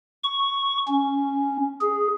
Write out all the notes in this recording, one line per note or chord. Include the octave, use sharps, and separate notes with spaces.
C#6
C#4
G#4